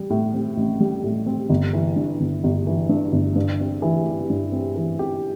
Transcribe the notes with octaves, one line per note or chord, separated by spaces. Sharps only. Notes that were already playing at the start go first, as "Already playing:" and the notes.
Already playing: G3
A2
C4
A1
G3
A2
C4
G1
E3
G2
G1
G1
E3
G2
G1
G2
C4
E3
G4
G2
C4
E3
G4